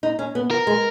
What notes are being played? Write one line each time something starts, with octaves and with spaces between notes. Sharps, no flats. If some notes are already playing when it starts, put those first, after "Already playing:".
D#4
C#4
B3
A#4
G#3